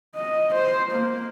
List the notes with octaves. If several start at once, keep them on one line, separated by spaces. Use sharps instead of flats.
D#5
C5
A#3